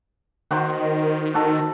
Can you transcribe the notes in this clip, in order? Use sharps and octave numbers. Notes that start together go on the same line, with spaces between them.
D#3 F#4 C5
F#4 A4